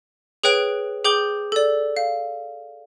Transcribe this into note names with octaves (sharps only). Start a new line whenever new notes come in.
G#4 B4 C#5 G5 F#6 D7
G#4 G5 D6 G6 G7
A4 D5
F5